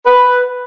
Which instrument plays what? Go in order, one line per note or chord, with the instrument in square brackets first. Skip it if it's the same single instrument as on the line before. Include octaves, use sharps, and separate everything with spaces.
[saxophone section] B4